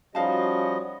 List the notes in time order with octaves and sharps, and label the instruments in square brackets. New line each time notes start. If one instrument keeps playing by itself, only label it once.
[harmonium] F3 G3 D#5 [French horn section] C#4 F#4 [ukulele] D#4 F5 A5